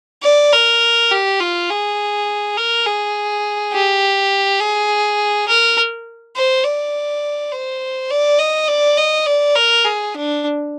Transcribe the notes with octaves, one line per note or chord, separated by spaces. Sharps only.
D5
A#4
G4
F4
G#4
A#4
G#4
G4
G#4
A#4
C5
D5
C5
D5
D#5
D5
D#5
D5
A#4
G#4
D4